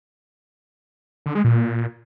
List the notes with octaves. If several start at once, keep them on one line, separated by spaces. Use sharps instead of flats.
D3
G#3
A#2